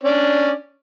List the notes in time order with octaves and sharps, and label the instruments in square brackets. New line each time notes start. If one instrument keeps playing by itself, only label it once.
[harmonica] C#4 D4 D5